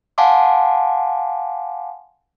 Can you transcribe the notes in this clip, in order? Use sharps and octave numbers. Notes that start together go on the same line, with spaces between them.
F5 F#5 G#5 A5 C6 D6